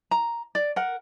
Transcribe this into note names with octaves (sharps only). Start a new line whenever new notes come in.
A#5
D5
A#4 F#5